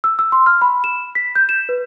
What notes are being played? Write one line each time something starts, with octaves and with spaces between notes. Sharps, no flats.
E6
E6
C6
F6
B5
E7
B6
G6
E7
B4